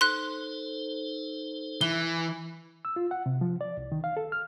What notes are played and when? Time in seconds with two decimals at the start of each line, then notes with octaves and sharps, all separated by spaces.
0.01 D#4 A4 C5 C6 F#6
1.81 E3 G7
2.85 E6
2.96 F4
3.11 F#5
3.26 C3
3.41 F3
3.61 D5
3.77 C2
3.92 D#3
4.04 F5
4.17 A4
4.32 F6